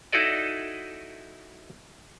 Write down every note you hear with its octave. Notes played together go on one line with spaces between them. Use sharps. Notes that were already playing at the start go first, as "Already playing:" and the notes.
D#4 E4 F#4 A4 D5 D#5